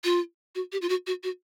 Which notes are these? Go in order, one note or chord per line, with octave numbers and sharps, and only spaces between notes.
F4
F#4
G4
F4
F#4
F#4
F#4